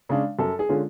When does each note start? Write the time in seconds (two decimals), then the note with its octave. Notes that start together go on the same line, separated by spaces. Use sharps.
0.09 C#3 G#3 D4
0.39 F#2 A4
0.59 G#4
0.69 D3 G#3 C#4 F4